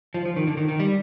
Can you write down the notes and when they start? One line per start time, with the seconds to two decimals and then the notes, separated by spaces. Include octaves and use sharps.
0.14 F3
0.25 F3
0.36 D#3
0.47 D3
0.57 D#3
0.68 D#3
0.80 G3